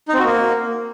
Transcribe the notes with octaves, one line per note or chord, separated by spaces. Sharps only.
D#4
C4
F#4
A#3